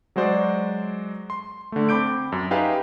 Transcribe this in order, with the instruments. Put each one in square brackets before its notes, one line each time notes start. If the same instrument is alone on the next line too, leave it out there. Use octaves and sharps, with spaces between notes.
[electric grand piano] F#3 G#3 F#4 C5 D5
C6
D3 A3
C4 B5 D6 G6 D7
F#2
D#4 G4 G#4 B4 E5 F5